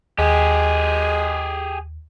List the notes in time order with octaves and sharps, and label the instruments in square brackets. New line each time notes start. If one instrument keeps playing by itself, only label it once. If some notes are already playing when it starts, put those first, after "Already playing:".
[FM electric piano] D#2 [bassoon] G#3 [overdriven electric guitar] G4 G#4